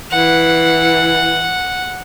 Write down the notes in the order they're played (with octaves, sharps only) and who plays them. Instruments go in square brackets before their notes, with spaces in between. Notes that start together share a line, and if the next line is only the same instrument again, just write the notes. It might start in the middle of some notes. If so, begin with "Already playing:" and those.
[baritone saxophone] E3 [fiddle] F#5